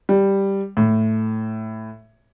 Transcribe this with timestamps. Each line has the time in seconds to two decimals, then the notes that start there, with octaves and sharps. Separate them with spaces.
0.09 G3
0.77 A2